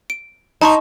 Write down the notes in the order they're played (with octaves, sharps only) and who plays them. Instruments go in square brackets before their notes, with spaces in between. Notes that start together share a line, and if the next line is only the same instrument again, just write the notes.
[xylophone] D7
[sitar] D#4 [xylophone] A5 C6 C#6